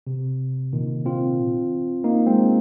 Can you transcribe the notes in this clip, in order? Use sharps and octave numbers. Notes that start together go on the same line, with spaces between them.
C3
A#2 D#3
C4 F4
A#3 D#4
G#3 C4